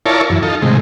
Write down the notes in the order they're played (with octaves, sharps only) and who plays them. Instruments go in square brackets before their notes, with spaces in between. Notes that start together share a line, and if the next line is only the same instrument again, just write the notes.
[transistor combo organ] E4 F4 A#4 C#5 D5 A5
F#2 E3
D#4 F4 A4
A2 C3 D#3 G#3